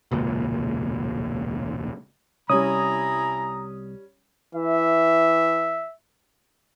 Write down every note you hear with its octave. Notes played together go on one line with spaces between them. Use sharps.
E1 C#2 A#2
C2 G3 C#4 E4 G#5 A#5 D#6
E3 E5